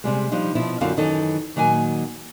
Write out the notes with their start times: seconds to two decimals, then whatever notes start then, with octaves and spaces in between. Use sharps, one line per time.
0.04 C3 G3 G#3
0.32 F3 G3 D4 D#4
0.55 B2 F3 E4
0.81 F#2 D3 C4 D#4 F4 F5
0.97 F#2 D#3 E3 D#4 A4
1.56 A#2 D#3 F#3 A#3 G#5